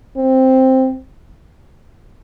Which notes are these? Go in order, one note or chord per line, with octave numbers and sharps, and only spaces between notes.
C4